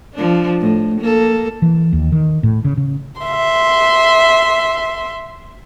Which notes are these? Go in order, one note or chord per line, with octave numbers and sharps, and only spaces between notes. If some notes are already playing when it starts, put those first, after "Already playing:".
F3 D4
A2
A#3 A4
E3
D#2
D#3
A2
C#3
C#3
E5 C6